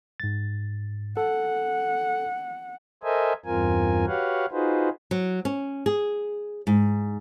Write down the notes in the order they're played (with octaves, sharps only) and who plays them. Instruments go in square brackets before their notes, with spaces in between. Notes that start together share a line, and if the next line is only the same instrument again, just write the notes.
[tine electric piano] G#2 A6
[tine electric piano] A4 [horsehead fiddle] F#5
[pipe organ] A4 A#4 C5 D#5 E5 G#5
E2 G2 C4 F4 A#4 G#5
F#4 G4 B4 C#5 F5 F#5
D#4 F4 F#4 G#4 B4 C5
[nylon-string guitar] F#3
C#4
G#4
G#2